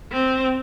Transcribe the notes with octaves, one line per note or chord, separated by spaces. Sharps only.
C4